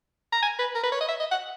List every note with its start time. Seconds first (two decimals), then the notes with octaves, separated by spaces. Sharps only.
0.32 A#5
0.42 G#5
0.59 B4
0.75 A#4
0.83 B4
0.92 C#5
1.00 D#5
1.09 E5
1.20 D#5
1.31 F#5